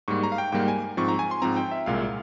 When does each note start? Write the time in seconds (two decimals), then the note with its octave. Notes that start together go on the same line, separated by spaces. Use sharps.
0.08 G#2 G3 A#3 C#6
0.23 A#5
0.32 F5
0.38 G5
0.52 G#2 G3 A#3 G5
0.68 G#5
0.97 G#2 F3 C4 C#6
1.08 A#5
1.19 G#5
1.31 C6
1.42 G#2 F3 C4 A#5
1.57 G5
1.71 E5
1.86 C2 A#2 G#3 F5